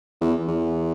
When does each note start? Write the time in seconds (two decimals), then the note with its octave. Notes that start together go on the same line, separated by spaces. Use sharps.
0.21 E2
0.48 E2